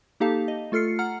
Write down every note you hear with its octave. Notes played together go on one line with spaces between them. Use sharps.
A#3 D#4 G4 A4 F5 A5
D#5
A3 F4 A4 F6 C7 C#7
F#5 A#5 F6